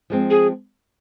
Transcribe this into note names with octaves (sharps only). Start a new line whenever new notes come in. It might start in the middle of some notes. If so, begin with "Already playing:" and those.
F3 G#3 C4
G#4